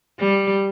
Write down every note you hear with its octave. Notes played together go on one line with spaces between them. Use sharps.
G3